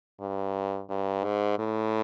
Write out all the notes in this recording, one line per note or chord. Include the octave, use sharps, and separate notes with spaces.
G2
G2
G#2
A2